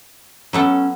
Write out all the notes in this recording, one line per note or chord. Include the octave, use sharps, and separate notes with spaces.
F#3 B3 C#4 A4